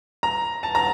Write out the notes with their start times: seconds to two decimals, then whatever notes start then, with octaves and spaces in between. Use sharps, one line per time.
0.23 A#5
0.63 A5
0.75 A#5